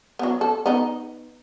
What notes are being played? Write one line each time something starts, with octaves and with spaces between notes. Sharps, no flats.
F#3 B3
A4
B3 D#4